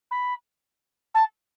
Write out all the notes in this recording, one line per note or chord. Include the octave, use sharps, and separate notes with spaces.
B5
A5